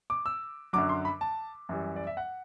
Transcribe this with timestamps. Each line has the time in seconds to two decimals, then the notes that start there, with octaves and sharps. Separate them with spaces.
0.10 D6
0.26 E6
0.73 F#2 D3 F#3 D6
0.89 C6
1.05 B5
1.21 A5
1.69 F#2 E3 G3
1.96 D5
2.07 E5
2.17 F#5